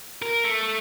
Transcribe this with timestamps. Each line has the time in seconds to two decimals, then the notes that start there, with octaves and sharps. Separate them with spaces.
0.22 A#4
0.45 A3